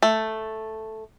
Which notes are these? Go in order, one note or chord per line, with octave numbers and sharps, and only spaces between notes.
A3